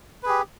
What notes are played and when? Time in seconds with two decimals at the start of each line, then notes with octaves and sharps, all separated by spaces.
0.23 B4
0.26 G#4
0.29 G4